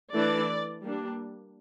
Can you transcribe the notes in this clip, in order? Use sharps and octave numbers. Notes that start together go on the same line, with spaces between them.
E3 A3 D4 D5
G3 A#3 D4